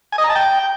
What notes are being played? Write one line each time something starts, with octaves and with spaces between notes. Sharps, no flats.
G#5
D#5
A#5
A5
G5